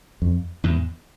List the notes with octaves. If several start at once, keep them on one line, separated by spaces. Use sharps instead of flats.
F2
E2 G#2